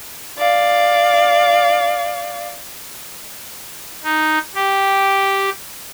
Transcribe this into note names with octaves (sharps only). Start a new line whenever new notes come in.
D5 F5
D#4
G4